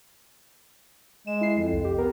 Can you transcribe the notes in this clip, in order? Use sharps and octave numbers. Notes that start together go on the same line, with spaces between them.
G#3 E7
E4 C7
F2 F3
C2
G4
B3 A#4